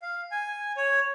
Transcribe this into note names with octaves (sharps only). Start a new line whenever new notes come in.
F5
G#5
C#5